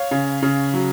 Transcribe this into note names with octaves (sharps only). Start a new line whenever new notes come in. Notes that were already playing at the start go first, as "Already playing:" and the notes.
Already playing: C#5 F5
C#3
C#3
F#3